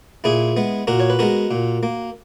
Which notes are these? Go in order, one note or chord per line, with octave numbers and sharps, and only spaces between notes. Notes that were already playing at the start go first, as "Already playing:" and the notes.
A#2 E4 G#4
G#3 B3
A#2 F#4 A#4
C#5
B4
G#3 B3 F#4 A#4
A#2
A#3